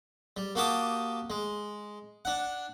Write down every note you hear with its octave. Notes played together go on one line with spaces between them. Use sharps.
G3
A#3 F#4 G4 A5 D6 D#6
G#3
D4 F#5